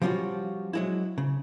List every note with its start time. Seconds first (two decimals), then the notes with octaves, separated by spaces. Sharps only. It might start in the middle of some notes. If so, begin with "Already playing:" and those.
0.02 F3 G3 B3 C#4 F4 F#4
0.73 F#3 G#3 E4
1.18 C#3